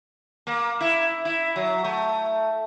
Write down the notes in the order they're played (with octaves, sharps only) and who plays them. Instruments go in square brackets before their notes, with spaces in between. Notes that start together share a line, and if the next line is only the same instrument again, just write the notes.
[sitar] A#3
E4
E4
F#3
A3